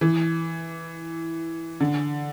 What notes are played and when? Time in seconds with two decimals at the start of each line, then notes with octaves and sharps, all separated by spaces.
0.01 E3
1.80 D3